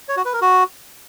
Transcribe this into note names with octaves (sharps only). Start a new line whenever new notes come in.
C#5
F#4
B4
A#4
F#4